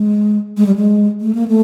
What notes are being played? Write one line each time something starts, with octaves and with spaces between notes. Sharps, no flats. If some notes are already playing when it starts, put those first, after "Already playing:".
Already playing: G#3
G#3
G3
G#3
A3
A#3
A3